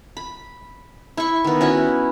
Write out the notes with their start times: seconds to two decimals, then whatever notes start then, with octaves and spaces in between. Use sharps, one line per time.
0.17 B5
1.17 E4 C#6
1.44 D#3 B3
1.61 C#4 E4 F#4 B5